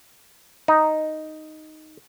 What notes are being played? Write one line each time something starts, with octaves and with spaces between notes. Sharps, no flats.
D#4